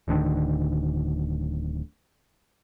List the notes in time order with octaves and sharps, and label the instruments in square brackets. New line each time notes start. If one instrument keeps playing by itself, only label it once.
[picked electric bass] D1 D2 D3 D#3